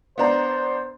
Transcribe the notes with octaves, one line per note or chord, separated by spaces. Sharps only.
B3 D4 C5 A#5